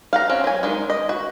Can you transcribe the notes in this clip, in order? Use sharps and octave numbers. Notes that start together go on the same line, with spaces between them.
F5 F#5 A#5
C4 C#4
F#3 G#5
D#3 G#3
D#5
F#4